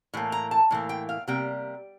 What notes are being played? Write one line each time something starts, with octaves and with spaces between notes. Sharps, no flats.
A2 E3 A#3
A#5
A5
A2 E3 A#3
G5
F5
C3 G3 A#3 G5